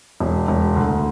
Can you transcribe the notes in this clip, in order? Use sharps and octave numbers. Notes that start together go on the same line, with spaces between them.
E1
E1
D2